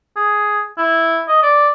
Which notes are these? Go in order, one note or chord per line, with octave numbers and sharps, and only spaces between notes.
G#4
E4
D#5
D5